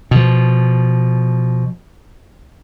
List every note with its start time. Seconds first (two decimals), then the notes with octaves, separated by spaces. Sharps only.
0.11 B2 F3